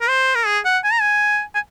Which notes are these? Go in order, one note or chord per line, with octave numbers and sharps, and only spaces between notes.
A#4
C5
A#4
G#4
F#5
G#5
A#5
G#5
G#5